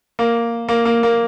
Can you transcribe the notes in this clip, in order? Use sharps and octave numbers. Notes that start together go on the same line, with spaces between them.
A#3
A#3
A#3
A#3